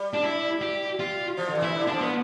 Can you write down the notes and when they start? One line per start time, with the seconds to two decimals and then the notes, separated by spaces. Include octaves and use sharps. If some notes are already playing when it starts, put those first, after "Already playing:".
Already playing: G3
0.14 D4
0.23 E4
0.62 G4
1.00 F4
1.37 F3
1.47 D3
1.55 E3
1.62 E4
1.75 D3
1.87 D4
1.93 F3
2.01 B3